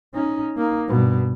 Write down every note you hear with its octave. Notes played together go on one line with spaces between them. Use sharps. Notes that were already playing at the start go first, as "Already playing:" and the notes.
C#4 D#4
A#3 D#4
G2 B2